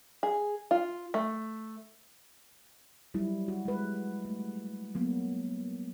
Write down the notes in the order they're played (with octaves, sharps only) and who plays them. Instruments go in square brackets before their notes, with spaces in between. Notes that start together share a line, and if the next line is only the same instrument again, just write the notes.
[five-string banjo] G#4
F4
A3
[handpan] F#3 G3 E4
F#4
G#3 B4
A3
F#3 A#3 B3